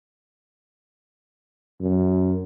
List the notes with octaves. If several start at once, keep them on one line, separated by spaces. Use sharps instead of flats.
F#2